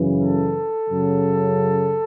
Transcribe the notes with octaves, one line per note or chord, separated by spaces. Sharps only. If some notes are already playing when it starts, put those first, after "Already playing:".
Already playing: F#2 C#3 E3
A4
F#2 C#3 F#3